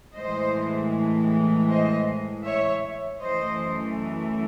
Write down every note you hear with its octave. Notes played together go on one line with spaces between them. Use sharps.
A2 E3 G#3 C5 D#5
C5 D#5
C#5 E5
F#2 E3 A3 C5 D#5